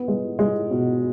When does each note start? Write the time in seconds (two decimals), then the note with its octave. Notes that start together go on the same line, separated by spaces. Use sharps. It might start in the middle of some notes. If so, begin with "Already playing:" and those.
Already playing: B3
0.08 G#3
0.39 G#3
0.71 B2